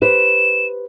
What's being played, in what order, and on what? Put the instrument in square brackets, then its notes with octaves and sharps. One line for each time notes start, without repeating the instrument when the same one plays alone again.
[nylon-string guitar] G4 B4 C5 [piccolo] E7